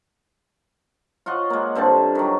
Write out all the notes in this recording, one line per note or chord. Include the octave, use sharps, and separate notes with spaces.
F4 C#5 D#5 F#5
G#3 A#3
G2 D3 C4 A5
D#3 F#3